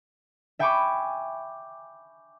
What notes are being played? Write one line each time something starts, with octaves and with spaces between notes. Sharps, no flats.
E5 G5 G#5 B5 C#6 D6